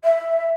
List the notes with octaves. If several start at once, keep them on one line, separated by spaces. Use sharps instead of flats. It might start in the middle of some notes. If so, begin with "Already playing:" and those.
E5